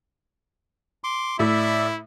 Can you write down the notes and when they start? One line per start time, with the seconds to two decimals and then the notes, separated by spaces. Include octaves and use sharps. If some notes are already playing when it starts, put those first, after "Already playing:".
1.04 C6 D6
1.39 A2 E4 D5 E5